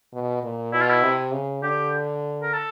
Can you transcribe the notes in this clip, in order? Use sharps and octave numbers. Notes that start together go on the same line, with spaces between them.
B2
A#2
B2 E4
F4
E4
C3
C#3
D3 G4
A#4
A4